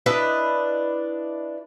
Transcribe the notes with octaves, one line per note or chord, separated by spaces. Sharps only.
D4 E4 B4 D#5